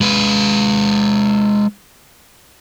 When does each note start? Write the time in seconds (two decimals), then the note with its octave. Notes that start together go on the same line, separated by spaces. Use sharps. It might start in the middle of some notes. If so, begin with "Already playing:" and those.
0.01 G#3 B4